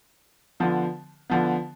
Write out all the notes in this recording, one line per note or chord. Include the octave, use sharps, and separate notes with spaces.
D3 F3 B3
D3 F3 B3